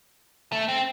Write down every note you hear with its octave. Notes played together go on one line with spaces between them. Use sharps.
A3
C4